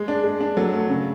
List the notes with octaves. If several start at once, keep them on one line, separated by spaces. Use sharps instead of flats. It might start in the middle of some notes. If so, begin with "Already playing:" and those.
Already playing: G#3
D4
G#3
D4
F#3 A4
A3
C#3